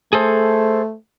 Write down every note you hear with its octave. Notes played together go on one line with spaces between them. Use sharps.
A3 G#4 A4 C5